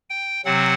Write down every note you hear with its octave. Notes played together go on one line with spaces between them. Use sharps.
G5
C3 F#3 C4 F#5